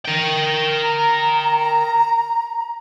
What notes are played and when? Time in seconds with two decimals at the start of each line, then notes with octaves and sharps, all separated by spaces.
0.05 A#4 G5
0.82 A#5